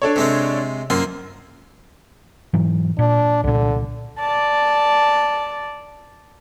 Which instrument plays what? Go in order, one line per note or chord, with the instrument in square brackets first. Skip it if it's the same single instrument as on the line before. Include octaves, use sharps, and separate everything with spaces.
[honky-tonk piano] D4 A4 C#5
[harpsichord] C3 G#3 C4
[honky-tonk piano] F#2 [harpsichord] F3 A#3 C6
[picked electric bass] G#2 E3 F#3
[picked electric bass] A#2 [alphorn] D4
[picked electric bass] C2 A#2 [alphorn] D3
[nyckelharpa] D5 A5